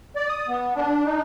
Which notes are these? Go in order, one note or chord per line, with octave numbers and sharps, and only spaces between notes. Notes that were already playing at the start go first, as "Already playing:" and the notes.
D5
D#6
B3
D4
D#4